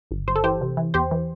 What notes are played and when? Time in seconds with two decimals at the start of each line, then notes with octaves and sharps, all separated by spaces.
0.11 G1
0.28 G1 C5
0.36 A4
0.44 E3 G4 C5
0.61 C3
0.77 E3
0.94 E2 G4 C5
1.11 E3